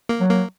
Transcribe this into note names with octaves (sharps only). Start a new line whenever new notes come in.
A#3
F#3
A#3